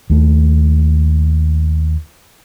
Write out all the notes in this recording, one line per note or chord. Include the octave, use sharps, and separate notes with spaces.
D#2 A3